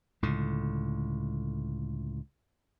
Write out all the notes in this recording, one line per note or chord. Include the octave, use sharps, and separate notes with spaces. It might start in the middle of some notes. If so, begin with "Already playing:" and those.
C#2 A2 D3